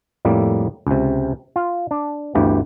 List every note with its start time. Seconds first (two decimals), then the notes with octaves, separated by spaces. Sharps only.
0.25 F2 A2 G3 A#3
0.87 C#2 C3
1.56 F4
1.91 D4
2.35 G1 D2 E3 G4